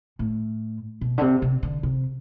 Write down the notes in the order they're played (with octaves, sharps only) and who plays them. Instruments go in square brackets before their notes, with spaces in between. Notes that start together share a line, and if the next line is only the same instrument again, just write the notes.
[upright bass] A2
B2
D3
C3
C3
D3
C3